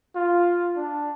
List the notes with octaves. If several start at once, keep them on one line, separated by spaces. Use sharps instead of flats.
F4
D4